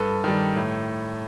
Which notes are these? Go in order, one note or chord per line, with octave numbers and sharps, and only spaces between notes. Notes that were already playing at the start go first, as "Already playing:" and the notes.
Already playing: G2 A4 B4
D#3 G3
A2